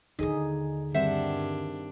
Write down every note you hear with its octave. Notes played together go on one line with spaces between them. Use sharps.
D#2 D3 D#4 G#4 D#5
G2 D#3 G3 C4 D4 C5 E5 F#5